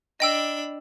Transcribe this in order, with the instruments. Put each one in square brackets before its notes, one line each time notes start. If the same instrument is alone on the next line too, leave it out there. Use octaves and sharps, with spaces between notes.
[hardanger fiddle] D4 B5 [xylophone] D#5 G5 E6